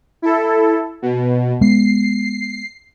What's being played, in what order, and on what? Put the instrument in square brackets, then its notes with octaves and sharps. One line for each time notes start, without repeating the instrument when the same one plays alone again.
[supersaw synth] E4 A4
B2
[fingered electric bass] G#3 B3 [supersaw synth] C7